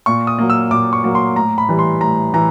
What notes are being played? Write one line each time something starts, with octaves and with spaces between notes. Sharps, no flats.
A#2 C#6
D#6
F#3 A#3
E6
A#2 D6
C#6
F#3 A#3
C6
A2 A#5
B5
E3 G3
C6
A2 A#5
E3 A#5